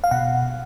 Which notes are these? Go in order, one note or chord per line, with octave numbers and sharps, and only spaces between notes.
F5
B2 F#5